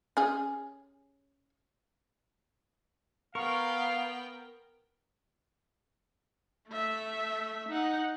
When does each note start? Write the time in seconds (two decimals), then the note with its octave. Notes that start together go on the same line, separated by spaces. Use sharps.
0.17 C#4 G#4
3.35 B3 A#4 F5 G5 C#6
6.68 A3 E5
7.69 D#4 F#5